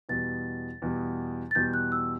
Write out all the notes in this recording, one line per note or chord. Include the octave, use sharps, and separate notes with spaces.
E2 B2 G3 A6
E2 B2 G3
A6
E2 B2 G3 G6
F#6
E6